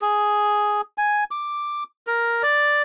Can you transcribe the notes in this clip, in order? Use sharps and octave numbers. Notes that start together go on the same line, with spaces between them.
G#4
G#5
D6
A#4
D5